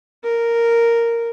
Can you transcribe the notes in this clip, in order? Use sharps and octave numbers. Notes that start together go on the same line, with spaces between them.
A#4